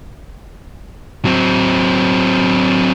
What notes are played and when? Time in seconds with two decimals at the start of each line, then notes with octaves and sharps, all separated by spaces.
1.25 F#3 C4